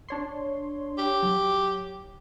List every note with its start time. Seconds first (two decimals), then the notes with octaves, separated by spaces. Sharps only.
0.09 D4 C#5 C6
0.98 G4
1.23 F#3